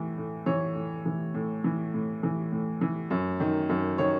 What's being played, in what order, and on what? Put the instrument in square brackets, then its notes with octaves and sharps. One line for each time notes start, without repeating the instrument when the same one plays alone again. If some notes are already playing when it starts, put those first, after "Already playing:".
Already playing: [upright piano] A2 E3
A2
E3 C#5
A2
E3
A2
E3
A2
E3
A2
E3
F#2
D#3
F#2
D#3 C#5